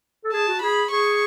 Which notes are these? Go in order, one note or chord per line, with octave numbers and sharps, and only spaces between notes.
A4
G#4 A5
F#4
G#4 B5
G#4 C#6